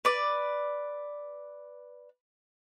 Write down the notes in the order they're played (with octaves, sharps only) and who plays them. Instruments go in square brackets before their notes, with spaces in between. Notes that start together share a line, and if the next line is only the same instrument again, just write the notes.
[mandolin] B4 D5